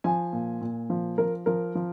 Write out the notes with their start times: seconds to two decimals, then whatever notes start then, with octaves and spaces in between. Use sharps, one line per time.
0.04 F3 G#5
0.33 A#2
0.61 A#2
0.90 F3
1.18 F3 A#4
1.46 F3 A#4
1.75 F3